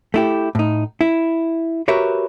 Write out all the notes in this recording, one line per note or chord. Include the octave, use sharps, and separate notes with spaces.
A3 E4 G4
A2 D#4
E4
F#4 G4 A#4 B4 C#5 E5